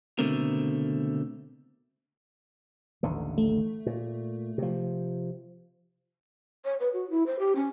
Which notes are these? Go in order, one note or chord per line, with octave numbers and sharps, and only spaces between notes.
C#2 B2 D3 A3 C4 A#4
A1 D#2 D3
A3
A#2
C3 F3
C#5
B4
F#4
E4
C5
G4
C#4